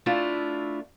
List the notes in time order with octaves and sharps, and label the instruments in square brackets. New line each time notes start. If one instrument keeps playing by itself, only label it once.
[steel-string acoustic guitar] A3 D4 E4 F4